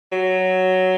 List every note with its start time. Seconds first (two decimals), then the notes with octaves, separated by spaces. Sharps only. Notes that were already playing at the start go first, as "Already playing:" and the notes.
0.12 F#3